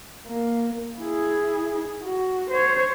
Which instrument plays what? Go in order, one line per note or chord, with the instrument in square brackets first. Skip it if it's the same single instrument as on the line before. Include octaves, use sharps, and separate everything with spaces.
[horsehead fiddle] A#3
E4 G#4
F#4
C5 C#5